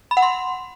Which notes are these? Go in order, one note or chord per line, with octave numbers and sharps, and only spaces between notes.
B5
F#5
C6